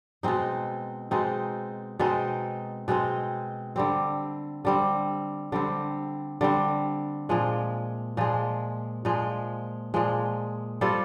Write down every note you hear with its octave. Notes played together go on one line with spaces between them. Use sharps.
B2 G#3 C4 D#4
B2 G#3 C4 D#4
B2 G#3 C4 D#4
B2 G#3 C4 D#4
D3 G3 C4
D3 G3 C4
D3 G3 C4
D3 G3 C4
A#2 F3 G#3
A#2 F3 G#3
A#2 F3 G#3
A#2 F3 G#3
G3 C4 F4 A4